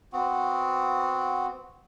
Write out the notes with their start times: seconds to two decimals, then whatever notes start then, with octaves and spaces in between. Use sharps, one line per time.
0.13 B3 C4 F#4